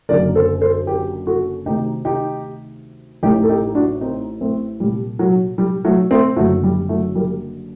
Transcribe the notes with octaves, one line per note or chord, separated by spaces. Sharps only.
F#1 F#2 D3 A#4 D5
A4 C5
A4 C5
G4 A#4
F#4 A4
D2 C3 D#3 D#4 G4
D#4 G4
A1 A2 D#4 G4
A4
D#4 G4
D4 F#4
C4 D#4
A3 C4
C2 A#2 G3
F#3
G3
F#3 A3
A3 C4
F#1 F#2 D3 F#3 A3
G3
F#3 A3
G3 A#3